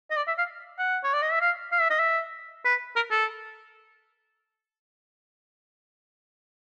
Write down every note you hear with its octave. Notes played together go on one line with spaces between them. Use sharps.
D#5
D5
E5
F5
F#5
C#5
D5
D#5
E5
F5
F5
E5
D#5
E5
B4
A#4
A4